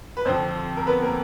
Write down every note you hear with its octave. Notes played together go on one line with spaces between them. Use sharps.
B4
F2 D3 F3 C4 C5
A#4
B3 B4
A#3 A#4